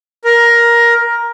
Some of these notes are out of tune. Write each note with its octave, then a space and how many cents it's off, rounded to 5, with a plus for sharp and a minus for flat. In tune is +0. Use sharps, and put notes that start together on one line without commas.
A#4 +10